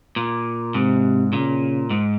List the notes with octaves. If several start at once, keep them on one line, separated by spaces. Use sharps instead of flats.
A#2
G#2 C3
A#2 C#3
G#2